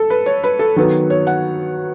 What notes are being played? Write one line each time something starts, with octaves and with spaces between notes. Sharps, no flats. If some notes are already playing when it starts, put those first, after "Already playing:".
Already playing: A4
B4
C#5
B4
A4
D#3 F#3 B3 A4
C#5
F#5